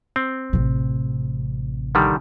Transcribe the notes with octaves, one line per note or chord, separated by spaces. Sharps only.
C4
A1 C3
D3 D#3 G3